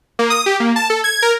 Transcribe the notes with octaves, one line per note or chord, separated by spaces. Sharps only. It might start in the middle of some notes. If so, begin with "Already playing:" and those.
A#3
D#6
G4
A#3
A5
A4
G#6
A#4